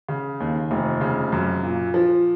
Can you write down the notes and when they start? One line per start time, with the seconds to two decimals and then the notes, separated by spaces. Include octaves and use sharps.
0.09 C#3
0.40 D#2
0.71 F1
1.01 C#3
1.32 F#2
1.63 A#2
1.94 F3